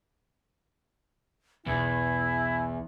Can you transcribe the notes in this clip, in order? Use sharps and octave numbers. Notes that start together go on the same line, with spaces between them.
E1 B1 E2 B3 E4 G#5